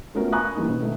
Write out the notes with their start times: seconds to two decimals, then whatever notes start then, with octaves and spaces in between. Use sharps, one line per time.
0.15 A3 B3 C#4 F4 F#4 A#4
0.33 G#5 A#5 B5 C#6 D#6 F#6
0.56 E3 G3 A#3 D4 D#4
0.68 B2 B3 C#4
0.82 D#3 A3